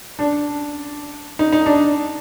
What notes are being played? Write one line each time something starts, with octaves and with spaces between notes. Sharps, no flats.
D4
D#4
D#4
D4